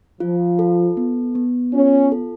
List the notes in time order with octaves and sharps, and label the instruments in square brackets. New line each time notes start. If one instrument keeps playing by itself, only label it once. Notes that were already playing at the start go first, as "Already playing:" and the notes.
[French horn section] F3 [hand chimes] F4
[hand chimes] A4
B3
B3
[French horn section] C#4 [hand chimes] F4
[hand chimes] A4